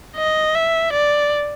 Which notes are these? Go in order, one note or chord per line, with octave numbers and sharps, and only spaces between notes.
D#5
E5
D5